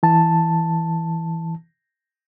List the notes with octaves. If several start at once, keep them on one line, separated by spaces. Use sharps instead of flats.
E3 A5